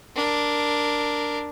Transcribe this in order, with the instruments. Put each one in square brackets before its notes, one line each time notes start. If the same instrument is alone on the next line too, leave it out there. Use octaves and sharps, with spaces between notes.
[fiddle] D4 A#4